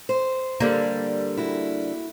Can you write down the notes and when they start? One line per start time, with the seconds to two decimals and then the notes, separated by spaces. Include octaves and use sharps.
0.09 C5
0.60 D3 G3 A#3
1.37 E4 F#4